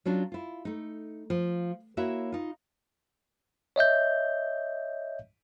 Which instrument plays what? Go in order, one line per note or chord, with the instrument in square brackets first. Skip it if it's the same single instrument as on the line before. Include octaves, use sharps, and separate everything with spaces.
[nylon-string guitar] F#3 C#4 D4 F4
E4 F4
A3 D#4
F3
A#3 E4 F#4 C#5 E5
D#4 F4
[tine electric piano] C#5 D#5 E5 G6